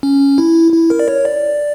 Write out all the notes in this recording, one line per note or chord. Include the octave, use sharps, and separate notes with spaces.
C#4
E4
E4
A#4
D5
C#5
D5